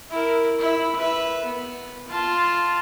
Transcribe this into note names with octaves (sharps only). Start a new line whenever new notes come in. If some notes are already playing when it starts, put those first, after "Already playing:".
E4 A#4
E4
B4 E5
B3
F4 A5